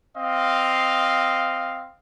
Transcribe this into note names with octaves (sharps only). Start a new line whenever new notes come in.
C4 D#5 F5